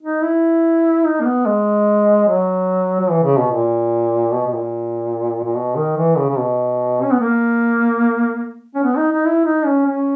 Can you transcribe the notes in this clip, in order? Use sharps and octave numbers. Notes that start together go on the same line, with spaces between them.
D#4
E4
D#4
A#3
B3
G#3
F#3
F#3
E3
C#3
B2
A#2
B2
B2
A#2
A#2
B2
D#3
E3
C#3
C#3
B2
C#4
B3
A#3
C#4
B3
D#4
D#4
E4
D#4
C#4
C#4